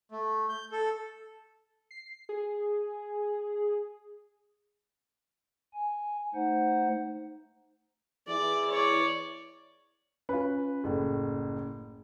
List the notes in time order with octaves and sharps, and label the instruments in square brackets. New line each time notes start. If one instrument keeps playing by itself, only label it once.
[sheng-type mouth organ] A3
G6
A4
[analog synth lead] C7
G#4
[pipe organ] G#5
A3 D#4 C5 F#5
[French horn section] E3 E4 G#4 [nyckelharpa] D5
[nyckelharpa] C#5 D5
[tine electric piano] C#4 [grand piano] F4 B4
[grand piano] F#1 A2